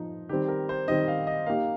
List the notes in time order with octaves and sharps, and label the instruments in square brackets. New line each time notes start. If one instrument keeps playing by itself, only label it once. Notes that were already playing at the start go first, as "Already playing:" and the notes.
Already playing: [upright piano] F3 D#4
[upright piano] D#3 G3 C4 [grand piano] G4
[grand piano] A#4
C5
[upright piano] D#3 G3 C4 [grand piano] D#5
[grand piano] F5
D#5
[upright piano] A#3 D#4 G4 [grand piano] F5